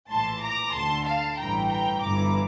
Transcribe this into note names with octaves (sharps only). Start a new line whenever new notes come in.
A#1 A2 E3 A5 C6
A#5 D6
D2 D3 A5 C6
F5 A5
A1 G2 E3 G5 A#5
G5 A#5
G1 G2 E3 A#5 D6